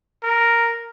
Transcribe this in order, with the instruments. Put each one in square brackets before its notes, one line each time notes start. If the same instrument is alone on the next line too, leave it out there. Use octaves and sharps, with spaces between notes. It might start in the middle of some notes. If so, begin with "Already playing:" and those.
[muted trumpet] A#4